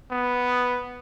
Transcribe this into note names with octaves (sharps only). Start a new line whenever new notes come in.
B3